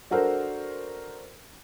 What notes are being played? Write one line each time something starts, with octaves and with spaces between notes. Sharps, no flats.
D4 F#4 A4 A#4 C5